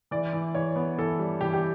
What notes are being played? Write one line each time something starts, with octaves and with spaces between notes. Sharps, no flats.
E3 D5
E3
E3 C#5
B3
E3 A4
G3
E3 G4
G4